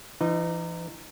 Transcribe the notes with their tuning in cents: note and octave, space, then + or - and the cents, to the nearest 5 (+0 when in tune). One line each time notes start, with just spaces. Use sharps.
E3 +35 D#4 -15